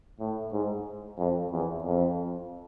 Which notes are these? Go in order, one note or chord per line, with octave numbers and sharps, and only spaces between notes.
A2
G#2
F2
E2
F2